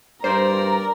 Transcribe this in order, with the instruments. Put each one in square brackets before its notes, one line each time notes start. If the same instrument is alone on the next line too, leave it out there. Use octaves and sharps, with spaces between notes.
[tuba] G2 [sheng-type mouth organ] A#4 D5 [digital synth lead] C5 [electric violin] A#5